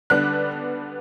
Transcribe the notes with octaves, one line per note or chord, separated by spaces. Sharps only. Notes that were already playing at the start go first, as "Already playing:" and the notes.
D3 G3 B3 D4 F#6